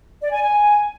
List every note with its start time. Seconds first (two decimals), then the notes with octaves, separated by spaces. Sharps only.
0.21 D5
0.32 G#5
0.43 G#5